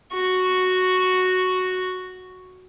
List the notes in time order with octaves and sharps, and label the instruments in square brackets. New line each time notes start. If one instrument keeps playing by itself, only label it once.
[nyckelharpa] F#4 C#6